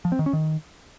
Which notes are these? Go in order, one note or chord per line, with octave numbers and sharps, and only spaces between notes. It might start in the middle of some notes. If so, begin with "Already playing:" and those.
F3
C4
D#3
C#4
D#3